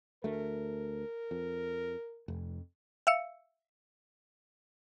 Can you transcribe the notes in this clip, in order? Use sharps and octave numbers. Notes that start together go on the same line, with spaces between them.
D2 A3 A#4
F2
F1 F2
E5 F5 E6 C#7